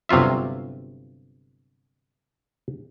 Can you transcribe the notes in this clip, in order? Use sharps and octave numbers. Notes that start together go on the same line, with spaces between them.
G1 C3 F#3 F4 E5